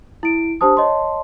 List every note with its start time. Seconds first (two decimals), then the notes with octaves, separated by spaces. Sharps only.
0.23 E4 D7
0.61 D4 G4 C5 A5 D#6
0.77 C#5 D#5 A5 C6